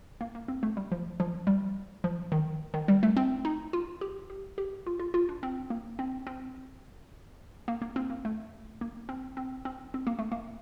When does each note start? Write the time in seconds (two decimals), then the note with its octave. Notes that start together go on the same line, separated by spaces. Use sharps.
0.21 A#3
0.35 A#3
0.48 C4
0.63 A3
0.77 G3
0.92 F3
1.20 F3
1.47 G3
2.04 F3
2.32 D#3
2.74 D#3
2.88 G3
3.03 A3
3.17 C4
3.45 D#4
3.73 F4
4.01 G4
4.30 G4
4.58 G4
4.87 F4
5.00 F4
5.14 F4
5.29 D4
5.43 C4
5.70 A#3
5.99 C4
6.27 C4
7.68 A#3
7.82 A#3
7.96 C4
8.10 A#3
8.25 A3
8.81 A#3
9.09 C4
9.37 C4
9.65 C4
9.94 C4
10.07 A#3
10.19 A3
10.32 A#3